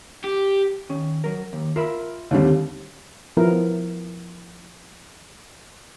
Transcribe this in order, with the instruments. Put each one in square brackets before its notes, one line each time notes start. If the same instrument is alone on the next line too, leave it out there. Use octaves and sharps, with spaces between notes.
[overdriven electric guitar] G4
[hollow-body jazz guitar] D#3 C#4
F#3 A#4
D#2
[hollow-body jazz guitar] F4 E5 B5 [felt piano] A#4
[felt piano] D#2 D3 G3 [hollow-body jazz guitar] A3 C4
[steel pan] F3 B3 E4 A#4